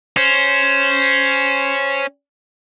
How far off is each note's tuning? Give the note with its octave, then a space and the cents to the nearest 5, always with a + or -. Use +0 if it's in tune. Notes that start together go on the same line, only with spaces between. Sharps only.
C#4 +0 C5 +0